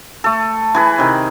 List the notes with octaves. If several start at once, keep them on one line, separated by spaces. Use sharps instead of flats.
A3 A4
E3 G#4 B4
C3 D#3